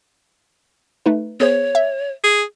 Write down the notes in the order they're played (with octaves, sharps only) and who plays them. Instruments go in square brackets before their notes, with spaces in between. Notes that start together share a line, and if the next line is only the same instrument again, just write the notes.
[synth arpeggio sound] A3 D#4 B4
[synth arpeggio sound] B3 G#4 C5 [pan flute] C#5
[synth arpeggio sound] E5
[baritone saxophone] G#4